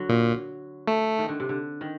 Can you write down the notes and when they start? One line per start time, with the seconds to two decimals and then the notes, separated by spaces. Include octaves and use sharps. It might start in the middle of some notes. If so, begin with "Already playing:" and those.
Already playing: D3 F#3
0.09 A#2
0.88 A3
1.19 D#3
1.29 D3
1.40 C3
1.49 D3
1.81 D#3